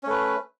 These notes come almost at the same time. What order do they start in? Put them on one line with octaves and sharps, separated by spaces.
C#4 A3 B4